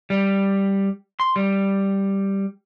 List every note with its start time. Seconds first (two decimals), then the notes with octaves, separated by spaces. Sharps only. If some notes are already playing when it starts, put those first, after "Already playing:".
0.10 G3
1.20 C6
1.36 G3